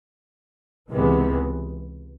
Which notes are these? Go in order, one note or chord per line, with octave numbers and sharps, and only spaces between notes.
C#2 C3 E3 G#3 B3